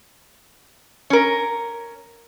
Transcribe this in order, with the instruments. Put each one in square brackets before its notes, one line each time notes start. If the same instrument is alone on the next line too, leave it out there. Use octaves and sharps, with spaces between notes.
[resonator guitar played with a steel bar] C#4 A#4